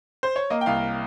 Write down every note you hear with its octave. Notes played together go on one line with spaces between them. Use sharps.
C5
C#5
A#3 D#5
G5
C2 F5